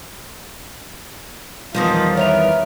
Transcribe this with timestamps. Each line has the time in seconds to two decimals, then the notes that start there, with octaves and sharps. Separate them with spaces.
1.74 E2 D#3 F3 G3 D#4 C5 D#5
2.17 B3 A#4 B4 C#5 E5 D6 F7